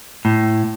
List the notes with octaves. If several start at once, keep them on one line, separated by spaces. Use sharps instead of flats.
A2